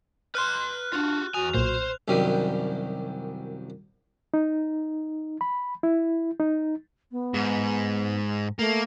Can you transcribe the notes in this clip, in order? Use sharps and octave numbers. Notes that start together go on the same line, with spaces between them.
B4 C6 F6 F#6
D4 F4 F#4
E2 F#4 G#5 D#6 F7
B1 A#2 C5
C2 F#2 D#3 G3
D#4
B5
E4
D#4
B3
G#2
A3 A#3